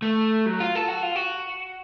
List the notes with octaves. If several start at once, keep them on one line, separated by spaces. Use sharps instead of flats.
A3
F#3
F4
A4
F#4
F4
F#4